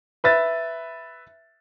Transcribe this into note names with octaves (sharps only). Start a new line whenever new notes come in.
B4 E5 A6